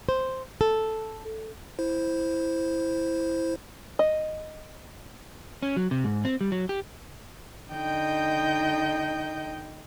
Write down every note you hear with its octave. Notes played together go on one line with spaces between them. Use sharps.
C5
A4
E4 C5
D#5
C#4
F#3
C3
G#2
C4
G3
F#3
G4
D3 D#4 D#5 G5 G6